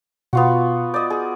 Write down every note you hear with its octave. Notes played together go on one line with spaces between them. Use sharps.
B2 B3 F4 F#4
D5 D#5 G6 A6
G#4